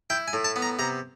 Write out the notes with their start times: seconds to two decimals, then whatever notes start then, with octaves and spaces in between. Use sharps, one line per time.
0.10 E4 G5
0.28 G#5
0.33 A2
0.44 A5
0.56 B3
0.62 A#5
0.79 C3 A#5